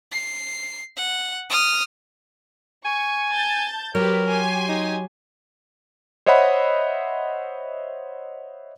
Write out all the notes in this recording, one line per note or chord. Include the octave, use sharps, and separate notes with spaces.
C7
F#5
D#6 F6
G#5 C#6
A5 G6 A6
F#3 G4 A#4 B4
G4 G#5 C6
D#4
C5 C#5 D#5 E5 F#5 B5